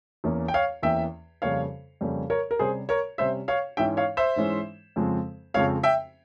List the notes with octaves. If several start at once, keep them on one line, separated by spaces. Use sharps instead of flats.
E2 E3 A#3 C#4
G5
C#5 F5
E2 E3 A#3 C#4 E5 G5
F2 C#3 G3 A#3 C#4 C#5 F5
F2 C#3 G3 A#3 C#4
A#4 C#5
A#4
C3 G3 C#4 G#4 C5
A#4 C#5
C3 G3 C#4 C5 E5
C#5 F5
G#2 E3 G#3 C#4 E5 G5
C#5 F5
C5 E5
G#2 E3 G#3 C#4
F2 C#3 F3 G#3 C4
F2 C#3 F3 G#3 C4 C#5 F5
E5 G5